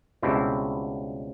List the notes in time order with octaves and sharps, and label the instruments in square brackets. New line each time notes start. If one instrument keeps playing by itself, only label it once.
[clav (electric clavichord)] C#2 B2 G3 C4 E4